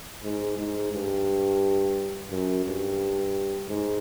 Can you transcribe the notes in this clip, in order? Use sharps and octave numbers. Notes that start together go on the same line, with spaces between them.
G#2
G#2
G2
F#2
G2
G#2